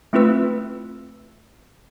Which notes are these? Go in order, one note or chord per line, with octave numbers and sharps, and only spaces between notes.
A3 C4 E4 F4 B4 E6